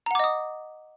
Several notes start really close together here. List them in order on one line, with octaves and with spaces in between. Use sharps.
A#5 F#5 D6 D#5 D#6